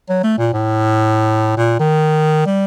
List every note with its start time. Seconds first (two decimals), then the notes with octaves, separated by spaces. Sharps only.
0.09 F#3
0.24 A3
0.38 A#2
0.53 A2
1.57 A#2
1.80 D#3
2.46 G3